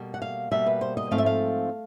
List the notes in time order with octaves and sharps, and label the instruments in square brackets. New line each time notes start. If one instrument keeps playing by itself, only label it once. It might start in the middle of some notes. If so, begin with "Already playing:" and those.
Already playing: [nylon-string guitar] B2 G3 A#3
F#5
F5
B2 G3 A#3 E5
B4
C5
D#5
G#2 F3 A3 C4 F5
E5
F5